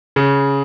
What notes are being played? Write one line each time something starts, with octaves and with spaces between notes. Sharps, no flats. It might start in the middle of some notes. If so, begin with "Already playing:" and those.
C#3